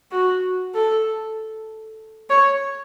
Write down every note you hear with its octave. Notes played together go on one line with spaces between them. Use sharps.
F#4
A4
C#5